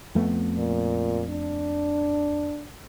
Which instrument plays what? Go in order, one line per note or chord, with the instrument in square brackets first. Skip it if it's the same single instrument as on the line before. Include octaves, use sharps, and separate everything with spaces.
[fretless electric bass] F2 A3 B3
[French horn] A#2
D4